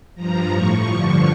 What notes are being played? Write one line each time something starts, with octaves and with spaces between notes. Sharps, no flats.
G2 F3 A#5
A2 F3 C#6
G2 D3 F3